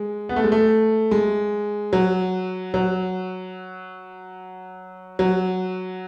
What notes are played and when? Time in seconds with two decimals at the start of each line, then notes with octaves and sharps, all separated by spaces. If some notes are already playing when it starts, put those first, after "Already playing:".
Already playing: G#3
0.29 B3
0.36 A3
0.44 G#3
0.52 A3
1.11 G#3
1.93 F#3
2.74 F#3
5.19 F#3